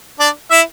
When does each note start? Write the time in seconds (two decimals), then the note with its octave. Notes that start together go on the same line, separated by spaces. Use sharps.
0.19 D4 D5
0.51 E4 E5